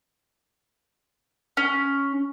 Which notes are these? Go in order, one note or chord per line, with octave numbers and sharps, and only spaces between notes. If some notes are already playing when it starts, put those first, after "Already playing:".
C#4